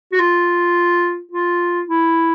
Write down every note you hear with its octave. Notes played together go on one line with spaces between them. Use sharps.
F#4
F4
F4
E4